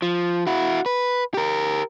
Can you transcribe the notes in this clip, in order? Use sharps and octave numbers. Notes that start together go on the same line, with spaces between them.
F3
E4 F#4
B4
G4 A#4